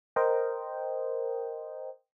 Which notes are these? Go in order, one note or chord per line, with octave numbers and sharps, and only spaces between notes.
A#4 C5 D#5 G5